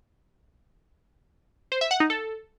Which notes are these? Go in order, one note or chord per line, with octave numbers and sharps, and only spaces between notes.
C5
E5
F#5
D#4
A4